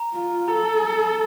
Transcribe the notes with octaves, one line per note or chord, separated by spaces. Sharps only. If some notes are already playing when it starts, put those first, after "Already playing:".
Already playing: A#5
F4
A4 A#5